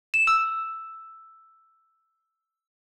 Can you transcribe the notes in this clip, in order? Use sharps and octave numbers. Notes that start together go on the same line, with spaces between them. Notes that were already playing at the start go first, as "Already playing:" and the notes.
E7
E6